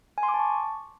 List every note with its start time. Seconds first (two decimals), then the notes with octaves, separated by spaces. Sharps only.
0.18 G#5
0.23 C6
0.28 D6
0.34 A5
0.39 C#6